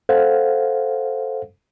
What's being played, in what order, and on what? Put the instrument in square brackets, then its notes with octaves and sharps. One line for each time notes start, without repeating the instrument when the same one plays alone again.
[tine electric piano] A4 C5 F5 F#5